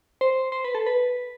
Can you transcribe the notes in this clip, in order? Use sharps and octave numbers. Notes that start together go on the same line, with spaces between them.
C5
C5
B4
A4
B4